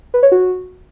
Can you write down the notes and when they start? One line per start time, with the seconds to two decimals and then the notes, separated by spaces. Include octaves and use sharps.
0.14 B4
0.23 C#5
0.32 F#4